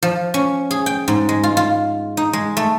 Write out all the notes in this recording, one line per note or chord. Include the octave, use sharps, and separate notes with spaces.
F3
C#4
G#4
G5
G#2
G#3
F4
F4
D#4
G#3
A3